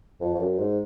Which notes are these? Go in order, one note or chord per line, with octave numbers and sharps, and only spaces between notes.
F2
F2
F#2
G#2